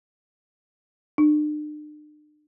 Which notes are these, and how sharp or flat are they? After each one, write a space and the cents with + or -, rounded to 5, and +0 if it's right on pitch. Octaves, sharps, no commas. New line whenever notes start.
D4 +45